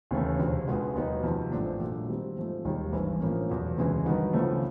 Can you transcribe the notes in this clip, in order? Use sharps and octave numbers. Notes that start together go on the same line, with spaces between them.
D#2 C#3 E3 A3 C#4
E1 D2 C3
C#2 B2 G#3 B3
D#2 D#3 F#3 B3 D#4
F2 C3 D#3
A1 G#2 F3 A3 D4
A#2 F#3 A3
D#3 G3 C4
G#2 F3 A3
E1 D#2 D#3 G3
G#1 G2 E3 G#3
A2 F3 A#3 C#4
F1 E2 B2 F#3
E1 D2 C#3 E3 G#3
G2 D#3 F#3 B3 D#4
C#2 C#3 F3 A3 C#4